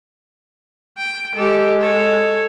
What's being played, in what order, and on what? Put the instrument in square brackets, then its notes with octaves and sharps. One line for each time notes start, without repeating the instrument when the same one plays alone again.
[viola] G5
[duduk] G#3 [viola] G4 A4
[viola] A4 C#5